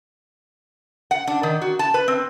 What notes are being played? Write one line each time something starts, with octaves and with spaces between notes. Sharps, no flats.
F#5
D4
D#3
F#4
A5
B4
C4